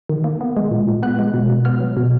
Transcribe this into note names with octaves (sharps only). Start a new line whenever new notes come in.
D#3
A#3
B3
G#3
A#2
A#2
B3 F#6
G#3
B2
B2
B3 F6
F#3
B2